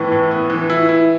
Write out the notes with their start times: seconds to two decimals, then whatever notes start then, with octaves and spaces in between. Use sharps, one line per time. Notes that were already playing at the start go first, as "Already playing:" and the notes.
Already playing: A2 E3 B3 E4
0.12 A2
0.31 B3
0.50 E3
0.70 E4
0.89 E4